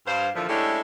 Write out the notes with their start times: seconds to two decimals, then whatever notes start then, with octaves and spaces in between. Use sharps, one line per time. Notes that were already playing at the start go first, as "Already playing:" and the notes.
0.06 G2 C5 F5
0.35 A#2 D3 E3 F3
0.48 G#3 A3 C#4 D4 E4 G4